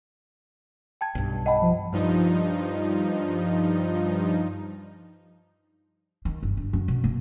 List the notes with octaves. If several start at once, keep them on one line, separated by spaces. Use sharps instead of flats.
G5 A5 G#6
B1 G2
D#5 F#5 G5 A5 B5
F3
G2 F3 D#4
D#3
G1
D3
F#2
B2
A#3